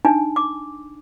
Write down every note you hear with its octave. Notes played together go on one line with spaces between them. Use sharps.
D4 D#4 G#5
D6